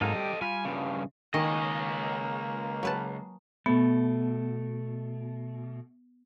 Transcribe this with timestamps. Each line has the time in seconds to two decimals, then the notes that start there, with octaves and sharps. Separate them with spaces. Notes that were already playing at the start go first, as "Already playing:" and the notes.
0.01 G#2 F#3 A#3 D#4 A4 D#5 F5
0.15 G3 G4
0.41 G3 F4 F5 G#5 B5
0.65 G2 C#3
1.34 C#2 D#3 A#3 D#5 G#5 C#6 D#6
2.83 F#3 B4 A5
3.66 B2 A3 B3